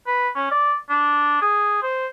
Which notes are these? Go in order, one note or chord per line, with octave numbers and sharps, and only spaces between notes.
B4
C#4
D5
D4
G#4
C5